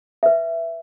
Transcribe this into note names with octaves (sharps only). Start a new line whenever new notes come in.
B4 E5